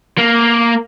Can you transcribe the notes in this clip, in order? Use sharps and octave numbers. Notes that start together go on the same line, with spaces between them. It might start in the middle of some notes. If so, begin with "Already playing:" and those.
A#3